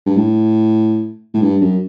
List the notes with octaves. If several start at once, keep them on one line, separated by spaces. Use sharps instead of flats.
G2
A2
A2
G2
F#2